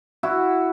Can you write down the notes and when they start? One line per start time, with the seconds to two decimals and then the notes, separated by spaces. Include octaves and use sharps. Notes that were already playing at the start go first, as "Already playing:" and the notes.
0.23 E4 F#4